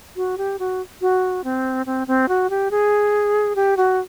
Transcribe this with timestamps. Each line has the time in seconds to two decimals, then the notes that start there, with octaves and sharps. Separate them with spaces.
0.16 F#4
0.38 G4
0.59 F#4
1.01 F#4
1.44 C4
1.86 C4
2.07 C4
2.29 F#4
2.50 G4
2.71 G#4
3.56 G4
3.77 F#4